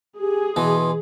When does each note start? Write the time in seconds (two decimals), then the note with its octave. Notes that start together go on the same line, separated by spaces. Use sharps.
0.20 G4 G#4
0.56 B2 E3 C6